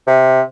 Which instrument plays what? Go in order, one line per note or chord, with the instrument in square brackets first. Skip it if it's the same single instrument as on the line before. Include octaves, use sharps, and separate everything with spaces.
[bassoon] C3